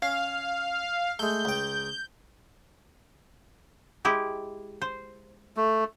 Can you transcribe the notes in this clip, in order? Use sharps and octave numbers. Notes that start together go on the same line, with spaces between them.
C#4 F5
G#3 A3 G6
C#2 G5
G#3 E4 G4
C5
A3